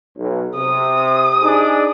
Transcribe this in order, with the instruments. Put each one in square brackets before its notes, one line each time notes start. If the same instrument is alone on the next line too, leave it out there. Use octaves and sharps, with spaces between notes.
[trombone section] B1
[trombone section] C3 [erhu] D#6
[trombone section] D4 D#4 G#4